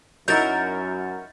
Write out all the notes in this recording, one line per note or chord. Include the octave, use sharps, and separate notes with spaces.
F#2 F#3 D#4 E4 F#4 A#4 G6 A6